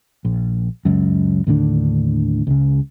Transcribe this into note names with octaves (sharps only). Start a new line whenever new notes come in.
A#1
C#2 F#2
D#2 A2 D3 D4
C#2 C#3